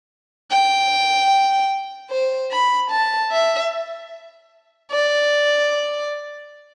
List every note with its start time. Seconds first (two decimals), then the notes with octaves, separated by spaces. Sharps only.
0.51 G5
2.11 C5
2.51 B5
2.90 A5
3.31 E5
4.91 D5